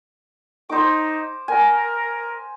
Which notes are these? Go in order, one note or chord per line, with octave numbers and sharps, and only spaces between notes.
D#4 C5 D6
A#4 G#5